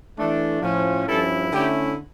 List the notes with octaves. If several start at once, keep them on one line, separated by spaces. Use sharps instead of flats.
E3 A3 D4
A2 F3 C#4
G2 F3 C#4 E4 A4
D3 A3 C#4 E4 G4